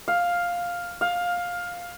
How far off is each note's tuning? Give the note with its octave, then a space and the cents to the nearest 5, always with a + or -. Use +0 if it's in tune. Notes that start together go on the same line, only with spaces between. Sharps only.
F5 +5
F5 +15